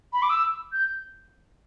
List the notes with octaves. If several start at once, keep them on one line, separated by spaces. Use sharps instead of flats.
B5
D6
E6
G6